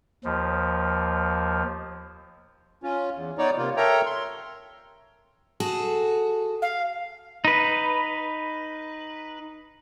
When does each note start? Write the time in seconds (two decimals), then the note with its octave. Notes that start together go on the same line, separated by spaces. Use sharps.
0.24 D#2 F3
2.83 C#4 F4
3.14 E2
3.38 B3 D#4 C#5 D5
3.57 C3 A#3 F4
3.77 A4 A#4 C#5 E5 G5 A#5
4.06 C6
5.60 F#4 G#4 A4
6.62 F5
7.45 D#4 B4